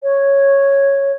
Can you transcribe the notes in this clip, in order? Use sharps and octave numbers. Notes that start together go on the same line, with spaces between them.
C#5